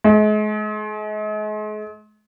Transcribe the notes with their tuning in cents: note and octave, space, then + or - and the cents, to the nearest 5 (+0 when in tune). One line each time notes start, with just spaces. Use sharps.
G#3 +40